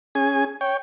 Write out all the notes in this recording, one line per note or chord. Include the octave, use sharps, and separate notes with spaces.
C#4 G#4 G#5
C#5 G5